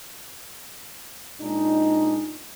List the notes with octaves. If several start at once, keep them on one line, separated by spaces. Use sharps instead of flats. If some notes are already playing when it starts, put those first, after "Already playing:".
A#2 G#3 D4 D#4